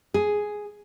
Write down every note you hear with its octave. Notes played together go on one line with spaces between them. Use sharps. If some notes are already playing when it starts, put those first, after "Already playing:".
G#4